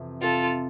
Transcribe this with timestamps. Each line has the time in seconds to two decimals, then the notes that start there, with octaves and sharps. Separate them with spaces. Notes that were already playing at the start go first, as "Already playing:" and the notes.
Already playing: F2 C3 E3
0.22 C3 F4 A4